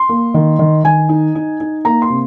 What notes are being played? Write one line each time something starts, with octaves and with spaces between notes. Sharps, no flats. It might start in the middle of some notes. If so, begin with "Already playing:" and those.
Already playing: C6
A#3
D#3
D#3
D#3 G#5
D#4
D#4
D#4
A#3 A#5
C6
C3